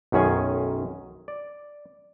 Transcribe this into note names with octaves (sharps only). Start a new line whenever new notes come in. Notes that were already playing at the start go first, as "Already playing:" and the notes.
B1 F#2 D#3 C#4 G#4 G#5
D5